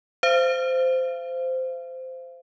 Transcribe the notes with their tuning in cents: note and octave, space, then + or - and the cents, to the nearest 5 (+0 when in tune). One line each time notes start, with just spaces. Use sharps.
C5 -15 F5 -35